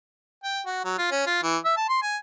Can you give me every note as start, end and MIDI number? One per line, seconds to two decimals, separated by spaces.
0.44 0.61 79
0.66 0.83 66
0.85 0.94 54
0.98 1.08 65
1.12 1.25 61
1.27 1.40 65
1.43 1.57 52
1.65 1.73 76
1.77 1.89 81
1.89 2.01 84
2.03 2.17 80